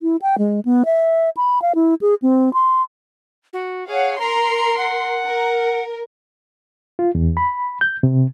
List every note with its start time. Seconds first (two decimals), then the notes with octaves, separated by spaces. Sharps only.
0.01 E4
0.22 G5
0.38 G#3
0.65 B3
0.85 E5
1.37 B5
1.62 F5
1.75 E4
2.01 G#4
2.22 C4
2.53 C6
3.53 F#4
3.88 G#4 C#5 F5 F#5
4.19 A#4 A#5 C6 C7
4.78 F#5
5.27 A#4
6.99 F4
7.15 E2
7.37 B5
7.81 G6
8.03 C3